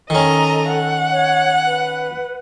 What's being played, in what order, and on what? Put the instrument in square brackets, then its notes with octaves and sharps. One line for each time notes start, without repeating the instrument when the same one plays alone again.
[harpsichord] D#3 C#4 [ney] A4 [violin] D#5 A#5
[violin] F#5
[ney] C#5
B4